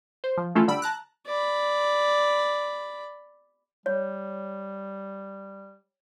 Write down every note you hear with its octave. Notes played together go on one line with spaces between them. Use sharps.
C5
F3
E3 A3 C#4 E4 F4 A4
D3 G3 B5 E6 D7
A5 A#5 F#6
D5 B5
G3 C#5